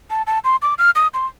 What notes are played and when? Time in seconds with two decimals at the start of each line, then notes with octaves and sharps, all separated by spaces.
0.10 A5
0.27 A5
0.44 C6
0.62 D6
0.78 F6
0.96 D#6
1.14 C6